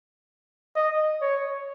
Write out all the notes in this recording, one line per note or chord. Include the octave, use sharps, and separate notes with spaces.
D#5
C#5